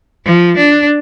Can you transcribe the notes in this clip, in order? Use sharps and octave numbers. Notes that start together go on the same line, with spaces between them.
F3
D4